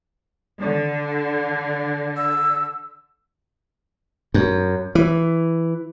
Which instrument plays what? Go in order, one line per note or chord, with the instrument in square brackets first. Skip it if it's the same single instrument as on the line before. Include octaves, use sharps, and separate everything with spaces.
[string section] D3
[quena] E6
[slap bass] F#2
E3